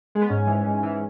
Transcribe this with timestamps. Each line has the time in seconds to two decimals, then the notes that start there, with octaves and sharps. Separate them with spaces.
0.15 G#3
0.22 B3
0.30 G#2 C#4
0.47 E3
0.66 G#2
0.83 E3